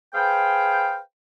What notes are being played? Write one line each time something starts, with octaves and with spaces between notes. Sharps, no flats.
G#4 B4 C5 F5 G5